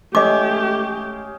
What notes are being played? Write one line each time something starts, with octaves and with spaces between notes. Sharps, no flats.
G#3 A3 C#4 G4 G#4 D#5 D6